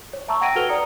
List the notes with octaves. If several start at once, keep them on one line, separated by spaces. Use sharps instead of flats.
C#5
E5 A5 A#5 C#6 E6
F#5 G5 G#6 A#6 D7 D#7
F#4 A4 B4 F6 F7 G7
D5 A#5 D#6 C#7